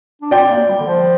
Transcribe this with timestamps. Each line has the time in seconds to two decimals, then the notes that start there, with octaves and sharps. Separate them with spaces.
0.22 D4
0.31 C4 D5 G5
0.50 A#3
0.68 G3
0.79 D3
0.86 F3